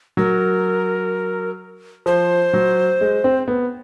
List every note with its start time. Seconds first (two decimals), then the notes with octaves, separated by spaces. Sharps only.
0.17 F#3 A#4
2.06 F3 C5
2.53 F#3
3.01 G#3
3.24 C4
3.48 B3